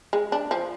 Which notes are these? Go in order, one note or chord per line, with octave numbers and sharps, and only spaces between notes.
G#3
D4
F3